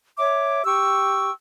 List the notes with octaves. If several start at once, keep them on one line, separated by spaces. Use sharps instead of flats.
C#5 E5 D6
G4 G5 C#6 E6